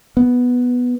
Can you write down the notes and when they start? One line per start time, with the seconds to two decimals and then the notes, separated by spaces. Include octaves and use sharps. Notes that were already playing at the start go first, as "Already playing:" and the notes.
0.17 B3